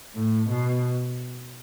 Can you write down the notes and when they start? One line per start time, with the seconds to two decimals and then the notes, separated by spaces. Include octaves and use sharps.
0.16 A2
0.50 B2